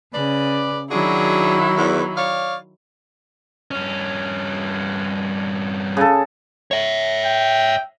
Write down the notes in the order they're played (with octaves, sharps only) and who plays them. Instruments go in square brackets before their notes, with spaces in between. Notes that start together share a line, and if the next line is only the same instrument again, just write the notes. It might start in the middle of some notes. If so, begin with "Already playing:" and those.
[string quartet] C#3 [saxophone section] B4 D5
[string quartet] D#3 F#3 E4 [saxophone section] D4 F#4 G#4
[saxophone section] E2
C#5 D5 F5
[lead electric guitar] G2 C#4
[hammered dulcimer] C#3 A4
[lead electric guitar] C#5 E5
[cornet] G5